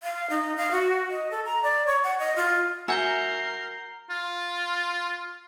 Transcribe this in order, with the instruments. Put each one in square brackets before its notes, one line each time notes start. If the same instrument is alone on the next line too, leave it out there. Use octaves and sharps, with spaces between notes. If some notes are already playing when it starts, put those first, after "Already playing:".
[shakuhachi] F5
D#4
F5
F#4
D#5
A4
A#5
D5
C#5
F#5
D#5
F4
[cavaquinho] F#4 E5 G#5 [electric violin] A#4 C7 [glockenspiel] A#5 G6 G7
[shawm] F4